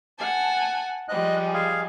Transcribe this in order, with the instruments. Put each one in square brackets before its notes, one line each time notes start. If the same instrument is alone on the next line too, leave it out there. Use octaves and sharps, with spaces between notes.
[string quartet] F#5 G#5 A5
[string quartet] F3 G3 G#3 [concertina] D#5 F#6
[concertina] G#4 F5